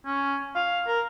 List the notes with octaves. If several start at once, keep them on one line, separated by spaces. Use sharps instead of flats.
C#4
F5
A#4